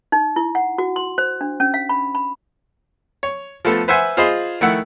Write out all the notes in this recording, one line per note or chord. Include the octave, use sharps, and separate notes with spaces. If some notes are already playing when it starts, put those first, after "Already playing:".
D#4
E4
F#5
F#4
C6
C5
D4
C#4
F5
B5
B5
C#5
F3 A3 B3 A4
B4 C5 E5 F#5 G#5
F4 G#4 C5 D#5 B5
D#3 A3 E4 F#5 E6